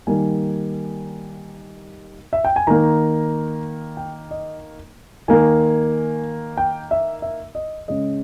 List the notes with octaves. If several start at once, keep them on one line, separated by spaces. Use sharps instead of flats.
D#3 G3 A#3 G#5
E5
G5
G#5
D#3 A#3 A#5
G5
D#5
D#3 A#3 G#5
G5
E5
E5
D#5
C#3 G#3 D#5